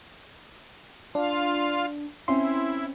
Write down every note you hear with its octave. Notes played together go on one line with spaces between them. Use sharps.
D4 F4 F5
C4 C#4 E4 E5 C6